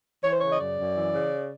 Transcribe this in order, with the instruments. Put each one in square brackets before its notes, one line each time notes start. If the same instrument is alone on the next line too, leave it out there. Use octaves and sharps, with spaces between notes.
[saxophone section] E3 C#5
C5
C#3 C#5
D#5
F#2 D5
F#2
E3
C#3